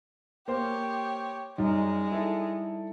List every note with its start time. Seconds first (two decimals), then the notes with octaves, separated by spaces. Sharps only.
0.48 A#3 G4 C5 C#5
1.58 F#2 G3 G#3 D#4
2.12 E4 A4